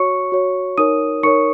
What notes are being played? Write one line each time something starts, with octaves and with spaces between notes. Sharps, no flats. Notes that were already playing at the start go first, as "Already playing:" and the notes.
Already playing: F#4 C#5 C#6 C#7
F#4 C#5
D#4 A#4 C#5 D#6 D#7
D#4 A#4 C#5 C#6 C#7